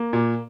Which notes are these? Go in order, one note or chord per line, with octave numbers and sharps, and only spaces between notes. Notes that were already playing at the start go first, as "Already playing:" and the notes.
Already playing: A#3
A#2